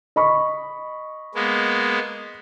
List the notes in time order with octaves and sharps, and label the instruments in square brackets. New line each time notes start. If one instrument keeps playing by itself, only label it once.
[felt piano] D#5 B5 C#6
[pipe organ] G#3 A#3 B3